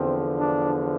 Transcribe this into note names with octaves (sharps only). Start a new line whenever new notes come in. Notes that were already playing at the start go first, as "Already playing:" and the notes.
Already playing: E2 D3 F3 C4
D4